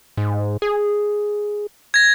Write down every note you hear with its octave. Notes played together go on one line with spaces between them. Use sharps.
G#2
G#4
G#6 A#6